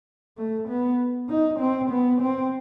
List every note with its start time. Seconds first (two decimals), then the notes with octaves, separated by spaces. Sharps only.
0.37 A3
0.69 B3
1.29 D#4
1.60 C4
1.90 B3
2.21 C4